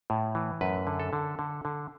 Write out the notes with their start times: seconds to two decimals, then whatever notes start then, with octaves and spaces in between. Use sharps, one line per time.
0.10 A2
0.35 E3
0.61 F#2 B4
0.87 D3
1.00 A4
1.13 D3
1.39 D3
1.65 D3